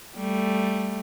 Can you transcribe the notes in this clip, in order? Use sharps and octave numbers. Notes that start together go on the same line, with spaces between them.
G3 A3